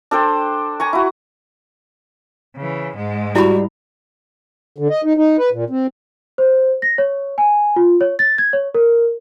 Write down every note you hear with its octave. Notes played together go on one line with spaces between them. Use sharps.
D4 A4 C5 G5
G#5 A#5 C#6
E4 F#4
C#3 E3
G#2 G#3
G3 E4 F#4 B5
D3
D#5
D#4
D#4
B4
A#2
C4
C5
A#6
C#5
G#5
F4
C#5
A6
G#6
C#5
A#4